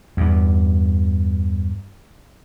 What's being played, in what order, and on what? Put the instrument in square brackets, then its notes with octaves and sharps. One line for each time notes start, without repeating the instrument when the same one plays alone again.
[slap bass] E2 G2